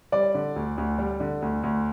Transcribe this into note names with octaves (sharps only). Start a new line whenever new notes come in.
G3 D5
D3
D2
D2
G3
D3
D2
D2